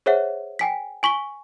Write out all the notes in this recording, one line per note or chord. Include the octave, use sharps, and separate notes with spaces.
G#4 C5 C#5 E5 F#5
G5 G#5 B6
G#5 C#6 B6 G7